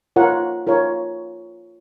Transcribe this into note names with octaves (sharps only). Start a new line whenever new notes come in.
F4 A#4 C#5 F#5
F4 A#4 C#5